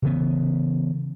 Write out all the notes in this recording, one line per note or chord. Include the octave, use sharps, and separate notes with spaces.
C#3 E3 B3